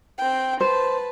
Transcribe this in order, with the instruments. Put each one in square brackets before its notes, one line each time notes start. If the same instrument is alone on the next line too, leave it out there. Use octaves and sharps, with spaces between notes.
[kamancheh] C4 G5
[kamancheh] B4 A5 [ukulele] C5